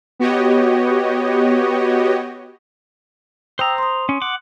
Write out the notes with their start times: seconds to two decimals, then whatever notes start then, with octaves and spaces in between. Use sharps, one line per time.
0.20 B3 F#4 G4 C#5 D#5
3.59 C5 G5 A#5 D#6 E6
3.78 C6 D#6
4.09 C#4
4.22 F#5 D6